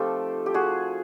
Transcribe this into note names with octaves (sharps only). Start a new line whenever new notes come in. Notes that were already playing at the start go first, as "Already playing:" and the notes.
Already playing: F3 A3 C4 D#4 F4 G4 A4
G4
F#4 G#4